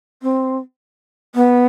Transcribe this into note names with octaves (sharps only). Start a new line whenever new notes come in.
C4
B3